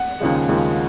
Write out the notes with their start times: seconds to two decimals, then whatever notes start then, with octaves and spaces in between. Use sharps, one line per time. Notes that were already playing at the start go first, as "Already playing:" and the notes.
Already playing: F#5
0.20 D#2 C#3 F3 G#3
0.48 D#2 C#3 F3 G#3